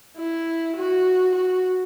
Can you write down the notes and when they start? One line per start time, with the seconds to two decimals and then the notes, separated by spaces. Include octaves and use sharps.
0.17 E4
0.77 F#4
1.36 F#4